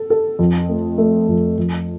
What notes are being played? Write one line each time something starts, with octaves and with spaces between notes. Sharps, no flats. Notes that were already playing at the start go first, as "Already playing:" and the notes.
Already playing: A4
A4
F2
A3
A3
F2
F2